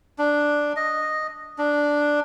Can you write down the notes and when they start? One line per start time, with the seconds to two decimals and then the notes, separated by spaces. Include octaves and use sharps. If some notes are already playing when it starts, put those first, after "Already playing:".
0.19 D4
0.76 D#5
1.58 D4